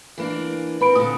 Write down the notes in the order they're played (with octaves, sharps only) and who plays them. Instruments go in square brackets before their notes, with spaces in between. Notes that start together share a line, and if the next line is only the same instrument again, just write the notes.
[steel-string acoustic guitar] E3 A#3 D4
[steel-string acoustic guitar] C4 [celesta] B4 B5 D7
[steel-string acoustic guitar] A#2 D3 [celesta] D#6